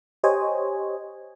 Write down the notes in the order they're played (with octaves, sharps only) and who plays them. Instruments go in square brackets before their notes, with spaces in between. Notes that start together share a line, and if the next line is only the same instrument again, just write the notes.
[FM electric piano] G4 C5 C#5 D#5 G#5